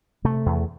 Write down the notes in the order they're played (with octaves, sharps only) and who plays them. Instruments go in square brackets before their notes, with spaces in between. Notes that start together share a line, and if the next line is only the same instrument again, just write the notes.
[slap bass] C3 A3
E2